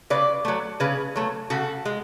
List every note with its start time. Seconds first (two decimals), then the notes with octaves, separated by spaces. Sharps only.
0.10 C#3 B4 D5
0.45 F#3 A3
0.80 C#3 G#4 B4
1.15 F#3 A3
1.50 C#3 F#4 A4
1.85 G#3